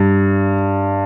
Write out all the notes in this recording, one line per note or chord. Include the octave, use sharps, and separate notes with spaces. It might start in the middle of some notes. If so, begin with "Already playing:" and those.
Already playing: G2